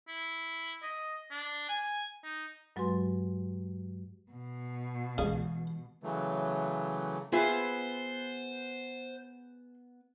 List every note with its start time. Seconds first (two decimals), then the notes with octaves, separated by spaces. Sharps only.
0.08 E4
0.82 D#5
1.31 D4
1.69 G#5
2.24 D#4
2.76 G2 F#3 G#3 F#4 B4 C6
4.32 B2
5.18 C#3 E3 G#3
6.03 C#3 E3 F#3 A3
7.33 B3 F4 G#4 B4 C5 E5